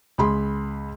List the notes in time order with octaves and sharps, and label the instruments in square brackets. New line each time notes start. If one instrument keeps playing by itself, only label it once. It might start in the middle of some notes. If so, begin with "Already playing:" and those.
[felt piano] C#2 G#4 B5 C6